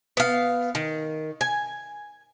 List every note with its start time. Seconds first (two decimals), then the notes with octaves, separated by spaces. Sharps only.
0.17 B3 F5
0.75 D#3
1.41 G#5